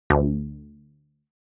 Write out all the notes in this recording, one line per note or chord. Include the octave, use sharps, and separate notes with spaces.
D2